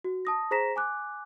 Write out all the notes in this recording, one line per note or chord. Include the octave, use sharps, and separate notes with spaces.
F#4
A5 D#6 A#6
G#4 C5 A#5 A#6 B6 E7
G#5 D6 F#6